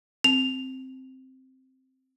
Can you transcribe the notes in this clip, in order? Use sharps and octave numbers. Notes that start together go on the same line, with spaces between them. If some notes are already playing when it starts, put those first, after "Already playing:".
C4 F7